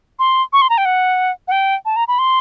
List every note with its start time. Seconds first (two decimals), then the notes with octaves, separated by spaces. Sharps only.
0.19 C6
0.53 C#6
0.62 C6
0.70 A#5
0.78 G5
0.85 F#5
1.48 F#5
1.52 G5
1.85 A5
1.96 A#5
2.08 B5
2.19 C6